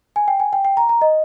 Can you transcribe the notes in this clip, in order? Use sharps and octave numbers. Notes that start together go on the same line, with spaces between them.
G#5
G5
G#5
G5
G5
A#5
A#5
D#5